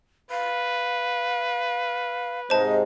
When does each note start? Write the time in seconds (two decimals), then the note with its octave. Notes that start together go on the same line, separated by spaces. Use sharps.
0.31 B4 F5
2.50 G#2 C3 G#3 C5 D#5 A5